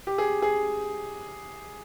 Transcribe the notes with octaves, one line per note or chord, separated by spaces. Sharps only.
G4
G#4
G#4